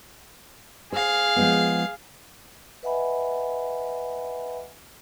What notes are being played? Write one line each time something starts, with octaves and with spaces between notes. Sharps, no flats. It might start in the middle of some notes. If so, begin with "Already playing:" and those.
G#4 C5 F5
F3 G#3 B3
B4 D#5 E5 F#5 G#5 B5